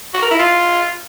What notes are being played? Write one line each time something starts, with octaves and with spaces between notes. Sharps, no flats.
F#4
A#4
E4
F4